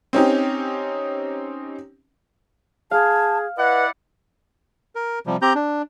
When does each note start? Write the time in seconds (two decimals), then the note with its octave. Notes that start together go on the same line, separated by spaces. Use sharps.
0.13 C4 C#4 D#4 G4
2.91 G#4 F5 A5
3.57 E4 B4 D5 D#5 F#5
4.95 A#4
5.26 C3 F3 G3
5.42 C4 G4 A#5 G6
5.55 D4